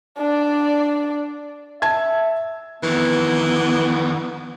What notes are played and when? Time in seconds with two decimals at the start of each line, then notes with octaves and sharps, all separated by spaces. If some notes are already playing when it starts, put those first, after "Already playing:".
0.18 D4 D5
1.82 E5 A5 G#6
2.83 F2 D#3 E3 B3